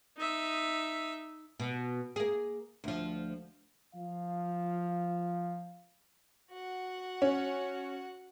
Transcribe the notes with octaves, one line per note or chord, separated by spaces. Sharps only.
D#4 E5
B2
A#3 G#4
D2 F3
F3 F5
F#4 F#5
C#4